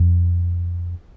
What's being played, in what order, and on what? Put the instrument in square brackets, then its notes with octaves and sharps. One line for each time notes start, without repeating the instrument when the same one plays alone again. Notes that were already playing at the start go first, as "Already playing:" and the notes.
Already playing: [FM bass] F2